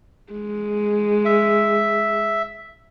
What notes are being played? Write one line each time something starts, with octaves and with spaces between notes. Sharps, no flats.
G#3
E5